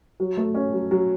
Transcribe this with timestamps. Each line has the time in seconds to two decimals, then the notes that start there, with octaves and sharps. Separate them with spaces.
0.20 F#3
0.37 A3
0.55 C#4
0.73 F#3
0.91 F#3